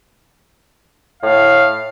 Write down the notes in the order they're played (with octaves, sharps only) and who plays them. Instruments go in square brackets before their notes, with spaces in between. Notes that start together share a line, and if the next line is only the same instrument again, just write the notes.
[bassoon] A2 [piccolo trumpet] F5